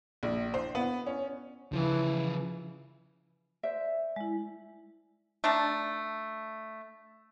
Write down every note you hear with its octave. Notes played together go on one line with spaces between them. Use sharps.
A#1
C5
B3
C#4
C#3 E3 F3 B4
C5 D5 E5
G#3 E4
A3 D4 A5 A#5